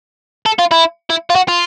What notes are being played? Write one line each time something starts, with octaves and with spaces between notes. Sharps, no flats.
A4
F4
E4
E4
F4
F#4
F4